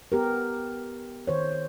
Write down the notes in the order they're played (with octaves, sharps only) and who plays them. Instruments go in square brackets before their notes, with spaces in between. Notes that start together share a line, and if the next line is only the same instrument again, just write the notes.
[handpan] B3 G4 A#4
D#3 C5 C#5